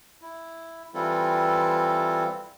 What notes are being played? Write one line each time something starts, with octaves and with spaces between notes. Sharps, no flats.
E4
E3 G3 C4 E4 F4 A4